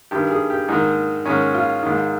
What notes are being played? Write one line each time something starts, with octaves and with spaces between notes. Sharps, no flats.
G2 D#3 G4
G#4
G4
G#2 D#3 D#4
G#2 D#3 C#4
F4
G#2 D#3